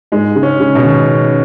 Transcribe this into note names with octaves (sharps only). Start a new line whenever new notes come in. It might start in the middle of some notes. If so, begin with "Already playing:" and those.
G#2 G#3
C#3
C#4
C#3
B2
D#3